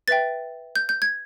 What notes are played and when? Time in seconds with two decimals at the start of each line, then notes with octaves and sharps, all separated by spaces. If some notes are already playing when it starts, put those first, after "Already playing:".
0.08 B4 E5 G5 A6
0.76 G6
0.89 G6
1.02 G#6